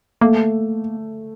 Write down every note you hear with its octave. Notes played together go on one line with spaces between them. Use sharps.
A3 A#3